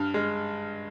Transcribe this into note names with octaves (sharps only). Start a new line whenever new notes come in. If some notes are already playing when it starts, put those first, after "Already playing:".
Already playing: G2 F6
G#3